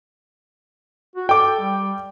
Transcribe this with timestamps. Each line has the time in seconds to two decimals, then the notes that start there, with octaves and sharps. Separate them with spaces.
1.16 F#4
1.29 A4 G5 D6
1.60 G3